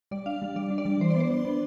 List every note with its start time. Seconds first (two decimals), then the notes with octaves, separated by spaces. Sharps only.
0.11 G3 D5
0.26 D4 F5
0.42 G3
0.56 G3 D5
0.70 D4
0.78 D5
0.85 G3
1.00 E3 C5
1.10 B3 D5
1.20 C5
1.31 D4
1.45 B3